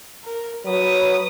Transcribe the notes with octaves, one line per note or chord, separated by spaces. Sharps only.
A#4
F#3 B4 D#6